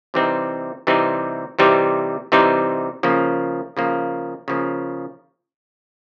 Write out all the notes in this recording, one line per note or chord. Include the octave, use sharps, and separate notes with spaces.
C3 E3 G3 C4 D#4
C3 E3 G3 C4 D#4
C3 E3 G3 C4 D#4
C3 E3 G3 C4 D#4
C#3 F3 A#3
C#3 F3 A#3
C#3 F3 A#3